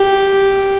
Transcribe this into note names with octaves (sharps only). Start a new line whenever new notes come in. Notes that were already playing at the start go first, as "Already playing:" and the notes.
Already playing: G4